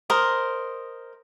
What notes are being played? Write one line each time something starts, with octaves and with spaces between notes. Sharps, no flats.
A#4 C5 D#5